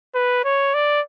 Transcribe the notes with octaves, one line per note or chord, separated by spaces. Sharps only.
B4
C#5
D5